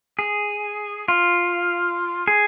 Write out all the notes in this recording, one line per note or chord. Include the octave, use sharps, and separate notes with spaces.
G#4
F4
G#4